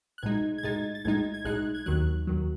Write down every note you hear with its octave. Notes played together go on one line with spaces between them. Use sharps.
F#6
B1 A2 G#3 D#4 G#6
G#6
B1 A2 G#3 D#4 A6
A6
B1 A2 G#3 D#4 G#6
G#6
B1 A2 G#3 D#4 F#6
G#6
D#2 D#3 F#3 F#6
D#2 D#3 F#3